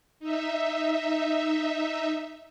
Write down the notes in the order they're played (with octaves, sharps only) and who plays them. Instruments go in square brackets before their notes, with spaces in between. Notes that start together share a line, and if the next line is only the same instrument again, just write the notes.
[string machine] D#4 E5